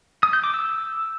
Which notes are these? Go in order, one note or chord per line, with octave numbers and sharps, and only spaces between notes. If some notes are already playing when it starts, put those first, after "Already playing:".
D#6
G6
D6
E6